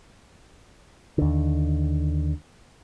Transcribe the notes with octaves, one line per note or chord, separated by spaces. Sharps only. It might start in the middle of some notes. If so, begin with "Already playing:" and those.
D#2 D3